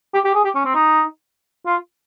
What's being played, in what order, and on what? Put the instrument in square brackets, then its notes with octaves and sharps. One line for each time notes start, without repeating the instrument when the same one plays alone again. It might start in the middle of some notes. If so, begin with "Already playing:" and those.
[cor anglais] G4
G4
G#4
G4
C#4
C4
D#4
F4